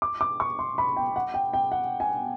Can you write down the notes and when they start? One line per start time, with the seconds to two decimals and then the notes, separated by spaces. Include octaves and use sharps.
0.02 D6
0.21 D6
0.40 C#6
0.59 C6
0.78 B5
0.97 G5
1.16 F#5
1.34 G5
1.54 G5
1.72 F#5
2.00 G#5